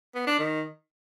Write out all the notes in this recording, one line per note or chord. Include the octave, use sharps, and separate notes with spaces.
B3
D4
D#3